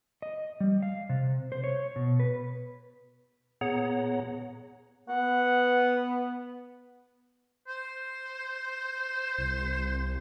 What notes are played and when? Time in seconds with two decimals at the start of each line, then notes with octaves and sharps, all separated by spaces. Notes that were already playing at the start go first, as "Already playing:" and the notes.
0.22 D#5
0.61 G3
0.82 F5
1.09 C3
1.52 C5
1.64 C#5
1.96 B2
2.20 B4
3.61 A#2 B3 G#4 C#5 F#5 A#5
5.09 B3 F#5
7.68 C5
9.38 C2